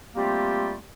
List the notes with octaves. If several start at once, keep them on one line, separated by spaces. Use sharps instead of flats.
G3 A3 A#3 C4 F4 G4